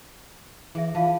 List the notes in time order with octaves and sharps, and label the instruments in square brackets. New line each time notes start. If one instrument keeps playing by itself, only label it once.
[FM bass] E3 [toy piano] G#4 E5
[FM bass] E3 [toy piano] F4 F5 A5